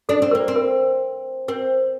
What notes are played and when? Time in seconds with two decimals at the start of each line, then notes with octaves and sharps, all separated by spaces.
0.09 D4 A4
0.22 C4
0.31 A#3 A#4
0.48 C4
0.56 A#4
1.48 C4 A#4